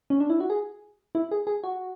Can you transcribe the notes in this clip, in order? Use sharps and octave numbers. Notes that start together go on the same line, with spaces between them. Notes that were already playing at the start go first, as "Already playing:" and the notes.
C#4
D4
E4
F#4
G#4
E4
G#4
G#4
F#4